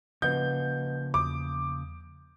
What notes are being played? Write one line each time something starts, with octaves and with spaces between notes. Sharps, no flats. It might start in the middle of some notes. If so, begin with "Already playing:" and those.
C#3 F3 A#3 B4 D#5 F#5 G6
E2 D6 D#6